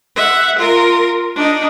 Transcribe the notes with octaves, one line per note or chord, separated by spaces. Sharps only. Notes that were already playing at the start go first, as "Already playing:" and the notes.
E5 F#5
F4 A#4
D4 D#4